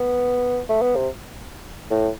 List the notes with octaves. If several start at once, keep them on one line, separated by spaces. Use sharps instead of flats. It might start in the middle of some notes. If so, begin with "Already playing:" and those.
Already playing: B3
A3
B3
C3
A2